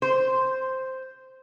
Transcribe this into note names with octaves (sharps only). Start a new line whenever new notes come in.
C5